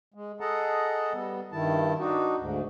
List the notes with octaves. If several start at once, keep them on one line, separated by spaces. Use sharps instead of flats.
G#3
G#4 A4 D#5 F#5 A5 A#5
G3 B3
G2 D#3 E4 A5
D4 D#4 F#4
D2 G#2